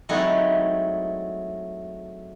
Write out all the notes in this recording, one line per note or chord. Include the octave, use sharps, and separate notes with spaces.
F#3 G#3 A3 C4 D#4 E4